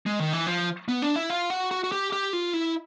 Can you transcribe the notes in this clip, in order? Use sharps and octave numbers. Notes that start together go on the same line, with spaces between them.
G#3
D#3
E3
F3
B3
D4
E4
F4
F#4
F#4
F#4
G4
G4
F4
E4